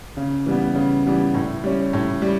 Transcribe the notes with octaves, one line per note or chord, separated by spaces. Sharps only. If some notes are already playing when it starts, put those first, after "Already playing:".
C#3
E3 G3 B3
C#3
E3 G3 B3
A2
G3 C#4
A2
G3